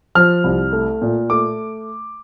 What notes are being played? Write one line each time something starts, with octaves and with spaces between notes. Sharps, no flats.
F3 F6
C2
A3
A#2
A3 D6